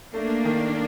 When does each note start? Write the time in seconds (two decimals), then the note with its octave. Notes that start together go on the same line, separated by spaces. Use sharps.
0.14 A3 A#3 D4
0.45 D#3